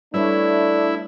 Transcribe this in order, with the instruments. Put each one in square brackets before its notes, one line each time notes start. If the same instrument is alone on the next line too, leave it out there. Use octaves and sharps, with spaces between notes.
[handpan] G3 B4 C#5 [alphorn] A3 [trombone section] D4 [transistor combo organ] E4